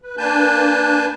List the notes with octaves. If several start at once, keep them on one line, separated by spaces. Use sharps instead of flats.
B4
A#3 D4 B4 G#5 A5 G6